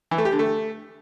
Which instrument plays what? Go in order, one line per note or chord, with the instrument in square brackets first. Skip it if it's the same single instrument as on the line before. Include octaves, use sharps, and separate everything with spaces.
[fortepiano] E3
A3
G4
D3
A3